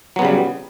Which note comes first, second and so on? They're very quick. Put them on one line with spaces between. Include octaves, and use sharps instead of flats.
F#3 B3 C#3 G3